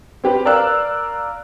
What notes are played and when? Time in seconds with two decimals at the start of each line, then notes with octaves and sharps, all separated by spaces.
0.24 C4 G4 B4
0.45 A#4 D5 F5 E6 F#6